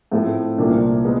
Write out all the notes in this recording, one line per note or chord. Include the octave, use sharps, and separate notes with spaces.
A2 F3 A3 C4
C2 A#2 F3 A#3 D4
G#3 B3